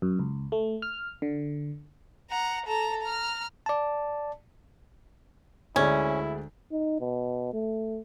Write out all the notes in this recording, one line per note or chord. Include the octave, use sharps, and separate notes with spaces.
F#2
C#2
A3
F6
D3
F#5 A#5
A4 A#5
A#5 F6
D5 A5
D2 G#3 C#4 E4 D5
D#4
B2
A3